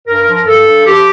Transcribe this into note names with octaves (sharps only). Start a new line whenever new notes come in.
G2 A#4
F3
A#4
G2 A4
G2
F3 G4